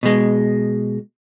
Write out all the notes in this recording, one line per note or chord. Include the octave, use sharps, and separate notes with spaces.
B2 G#3